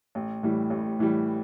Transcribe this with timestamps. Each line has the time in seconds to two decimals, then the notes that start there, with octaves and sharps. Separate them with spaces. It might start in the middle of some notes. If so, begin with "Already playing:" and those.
0.15 A1
0.43 A2 E3 G3
0.70 A1
0.99 A2 E3 G3